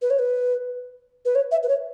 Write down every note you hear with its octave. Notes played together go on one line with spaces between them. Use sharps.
B4
C#5
B4
B4
C#5
E5
B4
C#5